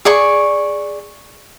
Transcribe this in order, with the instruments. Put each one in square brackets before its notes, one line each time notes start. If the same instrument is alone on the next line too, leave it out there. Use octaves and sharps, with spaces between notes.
[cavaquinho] G#4 D5 C#6